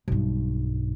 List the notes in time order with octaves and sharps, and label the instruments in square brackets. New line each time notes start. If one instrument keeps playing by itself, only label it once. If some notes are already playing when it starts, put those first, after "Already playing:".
[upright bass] B1 G2